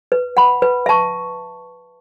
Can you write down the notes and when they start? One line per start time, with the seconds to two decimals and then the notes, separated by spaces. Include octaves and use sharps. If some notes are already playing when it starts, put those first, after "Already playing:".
0.12 B4
0.37 F#5 B5
0.62 B4
0.86 E5 A5 C#6